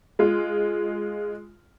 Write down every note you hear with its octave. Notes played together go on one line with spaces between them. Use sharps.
G#3 F4